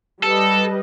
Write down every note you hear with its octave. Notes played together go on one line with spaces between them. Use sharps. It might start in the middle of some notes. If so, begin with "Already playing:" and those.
G3 A4 B4 D#5